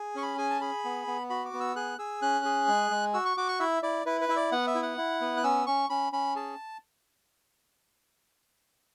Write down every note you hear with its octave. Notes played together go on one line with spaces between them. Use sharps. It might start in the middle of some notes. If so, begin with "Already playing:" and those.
Already playing: G#4
C#4 C#6
B5
G#4 G#5
A5
G#4 B5
B3
B3
F#4 B5
D6
B3
E6
G#4 F#6
G#4 E6
C#4 F#6
G#4
G#3
G#3
F#4 E6
C#6
F#4 D6
C#6
E4 E5
E4 D5
E4 B4
B4
E4 E5
D5
B3 F#5
E5
E4
F#5
E4
B3
F#6
C#4 E6
C#4 C#6
C#4 B5
C#4 B5
G#4 A5